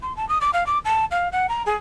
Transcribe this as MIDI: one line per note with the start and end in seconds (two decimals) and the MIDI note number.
0.02 0.15 84
0.16 0.27 81
0.29 0.38 87
0.41 0.51 86
0.53 0.66 77
0.66 0.78 86
0.85 1.05 81
1.11 1.28 77
1.32 1.47 78
1.49 1.63 82
1.66 1.76 68